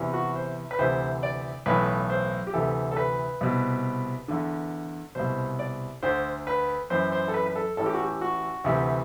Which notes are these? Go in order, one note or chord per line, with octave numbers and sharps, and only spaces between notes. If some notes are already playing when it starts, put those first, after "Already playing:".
Already playing: E2 C3 E3
F#4
C5
B4
D2 C3 E3 C5
D5
B1 A2 E3 B4
C5
G4
D2 C3 E3 A4
A4
B4
C2 B2
E2 D3
C2 B2 C5
D5
D2 D3 C5
B4
F#2 E3 C5
C5
A4
B4
B4
A4
A1 A2 E3 A4
G4
F#4
G4
F#4
D2 C3 E3